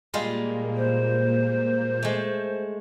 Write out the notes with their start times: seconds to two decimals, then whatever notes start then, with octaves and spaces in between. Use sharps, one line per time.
0.14 A#2 G3 G#3 A#3 F4
0.76 C5
2.03 G#3 A3